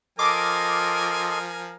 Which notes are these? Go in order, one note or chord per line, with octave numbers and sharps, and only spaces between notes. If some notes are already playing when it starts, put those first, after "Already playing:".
F3 A4 A#4 D#5 G#5 C6 D6